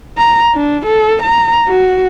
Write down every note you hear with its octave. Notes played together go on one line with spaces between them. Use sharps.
A#5
D4
A4
A#5
F#4